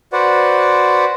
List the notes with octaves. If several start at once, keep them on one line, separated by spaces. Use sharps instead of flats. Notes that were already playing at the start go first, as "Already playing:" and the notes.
F#4 B4 C5 D5 F#5